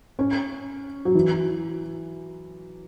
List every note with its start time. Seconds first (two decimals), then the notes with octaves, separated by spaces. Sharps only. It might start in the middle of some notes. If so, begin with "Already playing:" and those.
0.19 C#4
1.05 F#3
1.15 E3